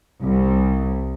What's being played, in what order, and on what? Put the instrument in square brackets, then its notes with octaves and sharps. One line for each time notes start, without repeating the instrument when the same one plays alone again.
[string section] C2